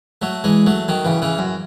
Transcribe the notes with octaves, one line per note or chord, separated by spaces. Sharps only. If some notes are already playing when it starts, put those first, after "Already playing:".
F#3 A3
E3 G#3
F#3 A3
D#3 F#3
C#3 E3
C#3 E3
F#2